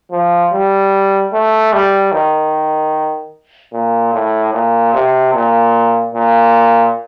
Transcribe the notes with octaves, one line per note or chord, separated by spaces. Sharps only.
F3
G3
A3
G3
D#3
A#2
A2
A#2
C3
A#2
A#2